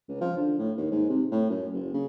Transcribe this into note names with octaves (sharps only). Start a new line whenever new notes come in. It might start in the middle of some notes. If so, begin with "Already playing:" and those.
C#2
F3
D3
A2
D#2
G#2
C3
A2
F#2
F#1
C#3